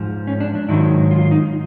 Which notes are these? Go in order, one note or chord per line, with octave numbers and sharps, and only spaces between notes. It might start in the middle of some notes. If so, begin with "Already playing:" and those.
Already playing: G#2 F3
C#4
D4
D4
G#2 D#3 F#3 E4
F4
F4
D#4